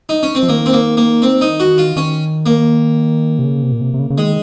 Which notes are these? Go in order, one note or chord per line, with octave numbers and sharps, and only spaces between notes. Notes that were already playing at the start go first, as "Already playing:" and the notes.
D#4
C#4
C4
F3
D#3 A#3
C4
A#3
A#3
C4
D#4
F#4
F4
D#3 C#4
A#3
C3
C#3
C3
A#2
C3
C3
C#3
C#3
D#3 G#3